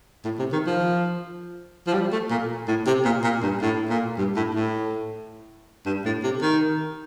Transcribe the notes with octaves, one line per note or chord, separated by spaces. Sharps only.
A2
C3
D#3
F3
F3
G3
A3
A#2
A2
C3
A#2
A#2
G2
A2
A#2
G2
A2
A2
G2
A2
C3
D#3